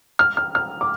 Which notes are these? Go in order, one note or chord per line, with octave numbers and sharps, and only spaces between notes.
F6
F6
F6
D6